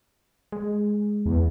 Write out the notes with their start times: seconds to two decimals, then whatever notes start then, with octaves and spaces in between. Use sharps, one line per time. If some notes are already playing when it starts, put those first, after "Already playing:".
0.52 G#3
1.25 E2